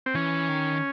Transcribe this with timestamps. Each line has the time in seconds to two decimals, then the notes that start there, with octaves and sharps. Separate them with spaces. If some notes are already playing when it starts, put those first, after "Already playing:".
0.06 C4
0.15 E3 C#4
0.48 D#3